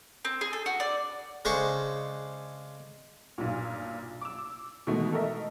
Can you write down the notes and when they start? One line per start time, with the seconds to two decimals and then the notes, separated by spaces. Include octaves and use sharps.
0.25 C4
0.41 G#4
0.53 A4
0.66 F#4
0.80 D5
1.45 C#3 G#3 D4 C5 C#6
3.38 B1 G2 A#2
4.21 D6 E6
4.87 B2 D#3 E3 G#3 A3
5.13 A4 A#4 D#5 E5